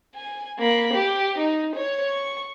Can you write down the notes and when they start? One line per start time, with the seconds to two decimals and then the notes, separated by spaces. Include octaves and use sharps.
0.15 G#5
0.59 A#3 B5
0.94 G4
1.39 D#4
1.75 C#5
2.06 C#6